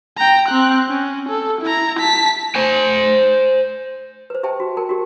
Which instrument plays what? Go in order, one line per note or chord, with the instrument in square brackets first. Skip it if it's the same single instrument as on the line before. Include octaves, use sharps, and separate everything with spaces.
[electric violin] G5 A#5
C4 F#6
C#4
A4
E4 A#5
A5 B6
[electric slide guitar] C5 G#5
[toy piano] B4 C5
G4 C5 E5 G5 A5
F#4
A#4 G5 A5
F#4 G4